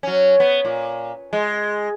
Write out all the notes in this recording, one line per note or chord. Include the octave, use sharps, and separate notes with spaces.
F#3 C#4
B3
A#2
G#3